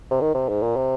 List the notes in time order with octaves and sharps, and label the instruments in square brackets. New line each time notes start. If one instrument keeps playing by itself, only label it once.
[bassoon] C3
D#3
C3
G#2
A#2
C3